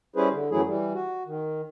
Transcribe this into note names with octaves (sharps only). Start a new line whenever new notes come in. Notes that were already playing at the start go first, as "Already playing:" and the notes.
G3 C#4 E4 G#4 B4 C5
D3
F#2 E3 F#3 A3 E4 G#4
E3 G3
F#4
D#3